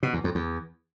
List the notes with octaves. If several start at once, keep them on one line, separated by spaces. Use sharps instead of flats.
B2
E2
F2
E2